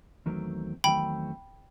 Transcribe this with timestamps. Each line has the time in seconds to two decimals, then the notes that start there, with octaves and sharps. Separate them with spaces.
0.26 E2 D#3 F#3 A3 C4
0.84 E2 D#3 F#3 A3 C4 G5 B5